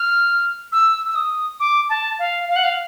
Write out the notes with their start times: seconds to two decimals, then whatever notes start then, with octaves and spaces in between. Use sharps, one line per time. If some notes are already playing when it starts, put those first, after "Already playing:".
Already playing: F6
0.72 E6
1.08 E6
1.15 D#6
1.60 D6
1.89 A5
2.19 F5
2.49 F5
2.56 F#5
2.63 F5